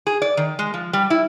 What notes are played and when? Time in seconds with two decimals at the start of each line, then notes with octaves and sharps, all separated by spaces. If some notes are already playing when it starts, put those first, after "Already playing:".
0.07 G#4
0.22 D5
0.37 D#3
0.59 G#3
0.74 F3
0.93 G3
1.10 E4